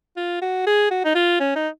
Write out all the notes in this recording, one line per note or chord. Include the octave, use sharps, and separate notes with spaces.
F4
F#4
G#4
F#4
D#4
F4
C#4
D#4